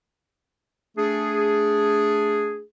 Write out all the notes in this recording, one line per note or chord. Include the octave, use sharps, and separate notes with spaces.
A3 D4 G#4